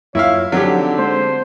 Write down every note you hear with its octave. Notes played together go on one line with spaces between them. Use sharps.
F#2 A#3 E4 F4 C#5 E5 F5
D3 F#3 C4 D#4 G4
G#3 A#3 C4 C5